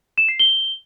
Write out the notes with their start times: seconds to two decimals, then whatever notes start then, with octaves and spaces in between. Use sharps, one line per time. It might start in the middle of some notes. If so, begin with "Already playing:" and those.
0.18 E7
0.29 C7
0.39 G7